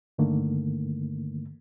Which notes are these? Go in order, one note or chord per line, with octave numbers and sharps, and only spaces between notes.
G2 D3 D#3 A3 A#3